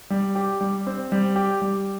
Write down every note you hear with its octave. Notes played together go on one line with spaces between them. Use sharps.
G3
G4
G3
C4
G3
G4
G3